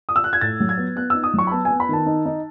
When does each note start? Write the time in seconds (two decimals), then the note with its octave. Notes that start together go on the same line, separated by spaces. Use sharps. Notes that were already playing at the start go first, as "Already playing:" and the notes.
0.09 D#6
0.16 E6
0.24 F#6
0.33 G#6
0.41 A2 A6
0.60 F#3
0.69 G#6
0.77 B3
0.96 B3 F#6
1.10 D#4 E6
1.24 D#6
1.34 F#3 C#6
1.47 B5
1.51 B3 A5
1.65 G#5
1.70 B3
1.80 B5
1.89 D#3 A5
2.06 D#4
2.26 D#4